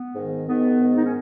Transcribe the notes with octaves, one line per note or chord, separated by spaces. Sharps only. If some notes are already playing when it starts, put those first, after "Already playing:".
Already playing: B3
G#2 D#3
G#2 D#3 B3
G#2 D#3
D#4
C#4